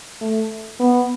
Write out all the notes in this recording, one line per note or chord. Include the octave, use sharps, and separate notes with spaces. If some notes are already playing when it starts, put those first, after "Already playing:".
A3
B3